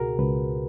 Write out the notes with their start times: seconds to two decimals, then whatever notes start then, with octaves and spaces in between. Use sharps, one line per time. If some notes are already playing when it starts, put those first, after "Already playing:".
Already playing: C#2 B2 F#4 G#4 A#4
0.18 C#2 B4